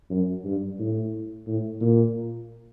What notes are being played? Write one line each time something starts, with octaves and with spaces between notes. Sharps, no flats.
F#2
G2
A2
A2
A#2